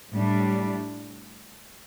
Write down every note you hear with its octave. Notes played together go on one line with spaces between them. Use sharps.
A2 G3 D4